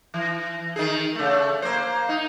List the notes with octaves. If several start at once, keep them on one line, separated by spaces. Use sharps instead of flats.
E3
D#3 G#4
C#3 A3
A#3 C5
D#4